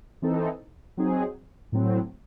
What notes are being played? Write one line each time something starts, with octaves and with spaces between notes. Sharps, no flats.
E3 C4 D#4 A4
F#3 C4 D#4 G#4
A2 F#3 C4